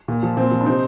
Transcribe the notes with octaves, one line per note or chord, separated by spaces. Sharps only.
A#2
F3
A#2 C4
F3
D4
C3 C4 D#4